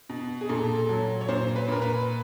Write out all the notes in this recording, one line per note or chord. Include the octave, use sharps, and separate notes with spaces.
B2
G#4
A#2 A4
A4
F#3
C#5
A#2 C5
B4
A#2 A#4
B4